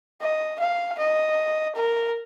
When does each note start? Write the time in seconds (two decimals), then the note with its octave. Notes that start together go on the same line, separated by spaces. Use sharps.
0.21 D#5
0.60 F5
0.98 D#5
1.75 A#4